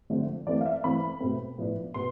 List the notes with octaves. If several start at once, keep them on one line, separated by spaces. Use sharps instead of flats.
D3 F3 A3 C4
E3 A3 C4 D5
F5
E5
E3 A3 C4 B5
B2 A3 C4
A2 F3 B3 D4
B2 B3 C6